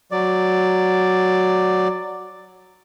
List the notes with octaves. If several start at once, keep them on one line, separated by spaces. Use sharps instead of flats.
F#3 D5